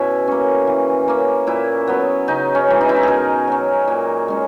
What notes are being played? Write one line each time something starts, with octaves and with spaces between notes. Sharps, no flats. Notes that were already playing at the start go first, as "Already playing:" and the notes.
Already playing: B2 C#4 E4
A#3 C#4
E3
A#3 C#4
A#2 E4
F#3 B3
C#3 D#4
C#4
E3 G#3
D#4
E4
D#4
B2 G#4 A#4
F#3 C#4
A#2
G#3 C#4